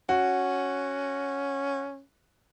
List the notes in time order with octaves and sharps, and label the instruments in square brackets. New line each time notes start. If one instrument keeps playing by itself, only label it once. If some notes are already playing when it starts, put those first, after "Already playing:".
[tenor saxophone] C#4 [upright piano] F#4